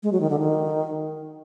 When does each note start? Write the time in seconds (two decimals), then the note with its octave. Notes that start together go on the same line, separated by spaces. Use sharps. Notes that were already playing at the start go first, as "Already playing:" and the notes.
0.03 G#3
0.12 F#3
0.21 D#3
0.30 D3
0.39 D#3